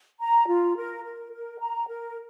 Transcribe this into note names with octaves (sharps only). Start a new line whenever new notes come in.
A#5
F4
A#4
A#4
A#4
A#5
A#4